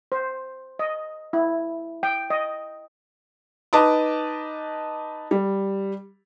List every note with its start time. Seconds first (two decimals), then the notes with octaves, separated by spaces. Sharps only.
0.12 C5
0.79 D#5
1.33 E4
2.03 G5
2.30 D#5
3.73 D#4 B4 A5 D6 D#6
5.31 G3